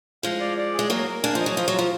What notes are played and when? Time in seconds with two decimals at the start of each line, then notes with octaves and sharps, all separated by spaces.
0.23 F3 G#3 F5
0.40 D5
0.58 D5
0.74 G#4
0.79 G#3
0.90 F#3 A#3 A#4
1.07 A#4
1.23 A#3 D4 G#5
1.35 F3 D#5
1.46 F#3
1.57 F3 F4
1.68 F#3
1.74 F3 F4